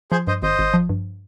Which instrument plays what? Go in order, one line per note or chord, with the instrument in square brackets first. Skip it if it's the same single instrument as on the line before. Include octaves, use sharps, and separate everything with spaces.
[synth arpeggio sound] F3 [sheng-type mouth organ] G#4 C5
[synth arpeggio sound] G2 [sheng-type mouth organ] C5 D#5
[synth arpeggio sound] G#1 [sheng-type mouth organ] C5 D#5
[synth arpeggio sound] G#1
F3
G2